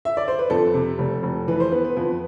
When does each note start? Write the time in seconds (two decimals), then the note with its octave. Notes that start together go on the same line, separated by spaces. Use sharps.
0.05 E5
0.17 D5
0.28 C5
0.39 B4
0.50 F2 A4
0.74 C3
0.99 F1
1.23 F1
1.48 E3 B4
1.60 C5
1.72 B3 B4
1.84 B4
1.96 F2 B4